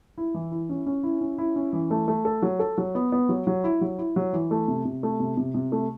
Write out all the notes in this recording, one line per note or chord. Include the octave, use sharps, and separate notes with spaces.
E4
E3
E4
C#4
C#4
E4
C#4
E4
C#4
E3
A3
A3
A4
F#3
A4
F#3
B3
B3
F#3
F#3
E4
F#3
E4
F#3
E3
A3
C3
C3
A3
C3
C3
C3
A3